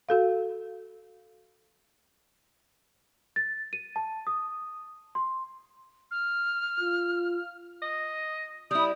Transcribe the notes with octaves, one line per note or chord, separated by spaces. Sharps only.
F#4 A4 F5
A6
D#7
A5
D#6
C6
F6
F4
D#5
G3 E4 D#6